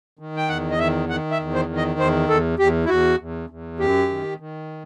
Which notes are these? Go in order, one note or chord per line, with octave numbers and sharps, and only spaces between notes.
D#3
G5
E2 F#5
D#5
D#3 E5
D#3 F#5
E5
E2
C5
D#3
D#5
E2 C5
E2 A4
E2 G4
E4
E2 F#4
E2
E2
F#2 G4
D#3
D#3